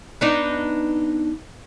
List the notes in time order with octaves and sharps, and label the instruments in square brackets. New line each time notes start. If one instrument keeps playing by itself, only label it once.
[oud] B3 D4 D#4